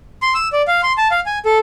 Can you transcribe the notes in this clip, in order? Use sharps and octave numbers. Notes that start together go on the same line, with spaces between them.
C6
E6
D5
F5
C6
A5
F5
G#5
A4